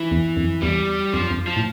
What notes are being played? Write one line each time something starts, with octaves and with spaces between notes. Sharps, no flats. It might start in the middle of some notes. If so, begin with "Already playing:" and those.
Already playing: E3
E2
F2
E2 G3
F2 F3
F2
F3
A2